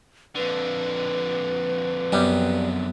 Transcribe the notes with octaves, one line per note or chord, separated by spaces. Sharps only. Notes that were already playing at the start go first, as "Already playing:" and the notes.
F2 D3 B4
F#2 G3 B3